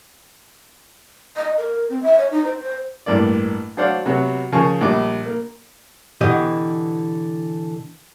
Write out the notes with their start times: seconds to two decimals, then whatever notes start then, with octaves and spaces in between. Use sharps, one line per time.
1.37 D#5
1.58 A#4
1.90 C4
2.03 E5
2.18 C#5
2.31 D#4
2.45 C5
2.60 C5
3.06 A1 G2 A#3 D5
3.77 F#3 D4 C5 D5 F5 F#5
4.05 C3 F#3 B3 F#4
4.52 C#3 F3 A#4 G#5 C#6
4.81 A#1 G3 D4 D6
5.26 A#3
6.21 B2 D3 E3 G4 D#5